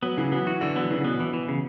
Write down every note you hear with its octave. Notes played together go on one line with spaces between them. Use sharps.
F#3 B3
C#3 E3
F#3 B3
E3 F#4
D3 E3
F#3 B3
C#3 E3
B2 B3
B2 E3
E3
C#3